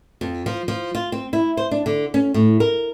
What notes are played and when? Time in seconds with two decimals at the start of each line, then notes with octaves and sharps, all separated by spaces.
0.21 F2
0.46 F3
0.68 F3
0.95 F4
1.12 C4
1.33 E4
1.57 C5
1.71 D4
1.86 D3
2.14 C#4
2.34 A2
2.60 A#4